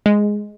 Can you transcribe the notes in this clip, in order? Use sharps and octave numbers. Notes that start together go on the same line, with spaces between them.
G#3